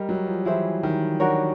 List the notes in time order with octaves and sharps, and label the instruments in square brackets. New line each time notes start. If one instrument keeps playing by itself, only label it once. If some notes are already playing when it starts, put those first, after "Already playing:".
Already playing: [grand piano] G3 [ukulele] A#4 D#5 A#5
[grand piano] F#3
F3
[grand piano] E3 [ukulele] E4 G#4 C5 E5
[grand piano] D#3
[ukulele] D4 F#4 A#4 C#5